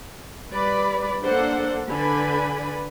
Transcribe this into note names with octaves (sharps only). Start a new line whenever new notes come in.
G3 B4 D5 B5
A#3 D4 A4 C5 D5 F#5
D3 B4 D5 G#5 B5